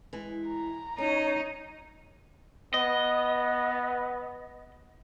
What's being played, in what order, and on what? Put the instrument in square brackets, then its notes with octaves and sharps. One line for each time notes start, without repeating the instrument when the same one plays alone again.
[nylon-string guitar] E3 G#3
[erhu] A#5
[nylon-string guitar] C#4 [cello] D#4 [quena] C#5
[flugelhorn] B3 [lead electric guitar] D#5